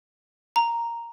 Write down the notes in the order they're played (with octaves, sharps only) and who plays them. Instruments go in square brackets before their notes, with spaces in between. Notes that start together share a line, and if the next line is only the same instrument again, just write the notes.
[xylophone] A#5